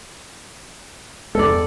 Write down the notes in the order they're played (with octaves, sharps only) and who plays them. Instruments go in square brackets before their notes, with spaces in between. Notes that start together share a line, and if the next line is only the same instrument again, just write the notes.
[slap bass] E2 G2 G#3 [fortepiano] A4 D5